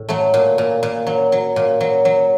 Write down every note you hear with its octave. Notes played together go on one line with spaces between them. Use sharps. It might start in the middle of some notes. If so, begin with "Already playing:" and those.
Already playing: A2
F#3 A3
A#2
A#2
A#2
F#3
F#3
A#2
F#3
F#3